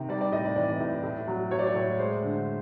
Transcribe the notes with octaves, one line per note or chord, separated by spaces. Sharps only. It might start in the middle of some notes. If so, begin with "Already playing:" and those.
Already playing: C3 D#3
G3 D5
D5
A2 D#5
D5
E3 D5
A2
A2
F#3
F#3 C#5
D5
C#5
A2
G#3 C5
D3